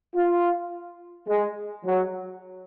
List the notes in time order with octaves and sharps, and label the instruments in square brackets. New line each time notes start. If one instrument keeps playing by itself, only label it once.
[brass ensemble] F4
G#3
F#3